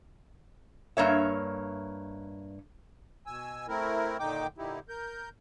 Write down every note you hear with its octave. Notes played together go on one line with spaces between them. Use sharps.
G2 A#3 C#5 E5
B2 G#5 E6
A3 C4 E4 A#4
A#2 D3 D#3 D#4 G5 D6
A#2 D3 D#4 E4 G4
A#4 G6